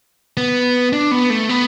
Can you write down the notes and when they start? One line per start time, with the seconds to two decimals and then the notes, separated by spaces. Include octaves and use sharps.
0.37 B3
0.93 D4
1.11 B3
1.30 A3
1.49 B3